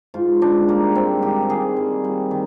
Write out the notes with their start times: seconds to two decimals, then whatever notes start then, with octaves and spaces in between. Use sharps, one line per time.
0.14 G#2 F4
0.42 G#2 D4
0.68 G3 A#3
0.95 G#2 C4
1.22 D#3 G4
1.50 D#3 G#4
1.77 G3
2.04 G3
2.31 D#3